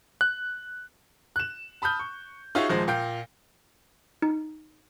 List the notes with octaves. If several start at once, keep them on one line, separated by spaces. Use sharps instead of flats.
F#6
F#6 E7
A5 B5 D#6 F6 G6
C#6
D#4 F4 F#4 G#4 C#5 E5
D#1 F3 G#3 C5 A#6
A#2 F5 G5 G6
D#4